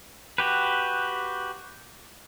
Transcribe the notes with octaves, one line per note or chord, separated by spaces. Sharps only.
F#4 G4 B4